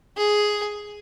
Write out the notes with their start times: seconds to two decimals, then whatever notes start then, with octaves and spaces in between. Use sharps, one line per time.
0.17 G#4